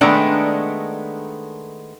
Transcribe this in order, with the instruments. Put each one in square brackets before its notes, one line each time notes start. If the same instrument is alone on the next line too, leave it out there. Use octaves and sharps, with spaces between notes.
[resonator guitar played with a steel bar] D#3 G#3 A3 B3 D4